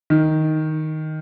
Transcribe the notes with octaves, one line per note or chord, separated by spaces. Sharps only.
D#3